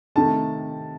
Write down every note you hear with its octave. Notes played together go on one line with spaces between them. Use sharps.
C3 D#3 A3 A5